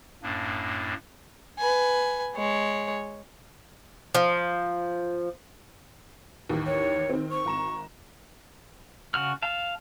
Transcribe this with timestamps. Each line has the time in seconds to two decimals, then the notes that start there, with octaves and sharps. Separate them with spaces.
0.23 F#2 A2 A#3 D4
1.58 B4 G#5
2.36 G#3 C#5
4.15 F3
6.49 A1 D#2
6.66 C#5
7.09 D#3 C4
7.31 C#6
7.46 G#1 A#5 E7
9.14 C#3 F#4 F6
9.42 F5 A5